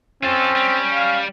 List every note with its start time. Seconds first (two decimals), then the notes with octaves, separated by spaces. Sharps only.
0.23 C4 C#4 F4 A4
0.56 G3
0.94 F5